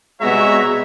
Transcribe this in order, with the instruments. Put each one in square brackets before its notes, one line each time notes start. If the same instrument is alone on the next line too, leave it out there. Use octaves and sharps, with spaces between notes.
[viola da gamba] C3 G3 B3 [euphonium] G#3 [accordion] F#4 C#5 A#5 [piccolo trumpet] E5